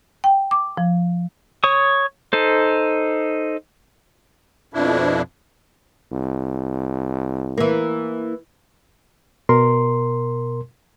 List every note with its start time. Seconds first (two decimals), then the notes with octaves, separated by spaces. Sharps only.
0.24 G5
0.51 D6
0.77 F3
1.64 C#5 C#6 D#6
2.33 D#4 A4 C5
4.74 F2 B2 F3 D4 E4
6.12 C2
7.58 E3 A#3
9.49 B2 A#4 C6